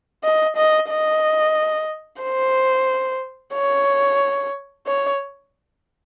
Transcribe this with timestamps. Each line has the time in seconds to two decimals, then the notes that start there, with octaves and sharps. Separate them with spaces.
0.24 D#5
0.57 D#5
0.90 D#5
2.22 C5
3.55 C#5
4.87 C#5